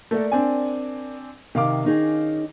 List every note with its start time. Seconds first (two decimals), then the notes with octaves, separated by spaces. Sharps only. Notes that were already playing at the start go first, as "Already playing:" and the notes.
0.11 A3 A#3 A#4 D5 F#5
0.32 C4 D4 G#5
1.55 C3 D#3 F5 D6
1.85 C#4 D#4 G#4